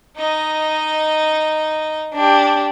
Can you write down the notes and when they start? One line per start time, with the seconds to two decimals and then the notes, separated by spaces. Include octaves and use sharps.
0.16 D#4 D#5
2.14 D4 G4